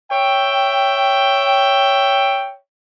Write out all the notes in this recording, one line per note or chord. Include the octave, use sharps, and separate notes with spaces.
C#5 E5 G5